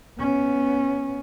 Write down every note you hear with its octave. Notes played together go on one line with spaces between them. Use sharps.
B3 C#4